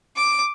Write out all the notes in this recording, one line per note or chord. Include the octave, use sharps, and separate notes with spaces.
D6